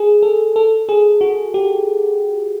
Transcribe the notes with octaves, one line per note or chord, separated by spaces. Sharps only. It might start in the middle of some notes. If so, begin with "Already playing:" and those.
Already playing: G#4
A4
A4
G#4
F#4
G4